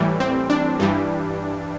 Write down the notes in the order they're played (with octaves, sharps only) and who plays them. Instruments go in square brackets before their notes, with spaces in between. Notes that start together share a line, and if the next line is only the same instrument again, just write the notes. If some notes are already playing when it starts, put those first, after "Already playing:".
Already playing: [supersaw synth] A2 E3 G3
C4
D4
G2 E3 G3